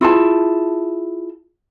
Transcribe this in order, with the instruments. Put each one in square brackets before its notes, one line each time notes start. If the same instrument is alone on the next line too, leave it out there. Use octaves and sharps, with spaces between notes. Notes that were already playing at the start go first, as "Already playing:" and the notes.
[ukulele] E4 F4 G#4 A5